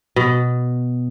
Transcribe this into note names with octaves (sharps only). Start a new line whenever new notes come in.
B2